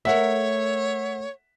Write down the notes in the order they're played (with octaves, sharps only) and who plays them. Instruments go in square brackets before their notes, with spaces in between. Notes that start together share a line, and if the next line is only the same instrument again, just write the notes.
[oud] A3 A#4 [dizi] C#5 [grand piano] E5 F#5